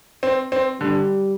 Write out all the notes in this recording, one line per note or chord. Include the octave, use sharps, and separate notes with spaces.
C4
C4
D3 G3